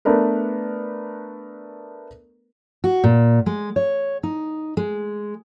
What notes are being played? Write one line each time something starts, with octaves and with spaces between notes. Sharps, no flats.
A3 B3 D4 A#4 B4
F#4
A#2
G#3
C#5
D#4
G#3